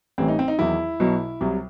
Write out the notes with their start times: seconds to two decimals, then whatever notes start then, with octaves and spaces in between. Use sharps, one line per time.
0.18 A1 A2 E3 G3 C4
0.28 D#4
0.39 C4
0.48 D#4
0.58 E2 D#3 F#3 E4
1.00 B1 B2 F#3
1.41 C2 C3 F#3